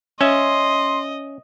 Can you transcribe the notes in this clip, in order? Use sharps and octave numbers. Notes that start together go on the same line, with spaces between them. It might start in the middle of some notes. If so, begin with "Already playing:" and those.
C#4 D#5 E5 C6